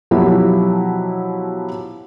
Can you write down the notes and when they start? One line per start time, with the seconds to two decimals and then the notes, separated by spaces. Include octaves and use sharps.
0.11 B2 F3 F#3 E4 F#4 G4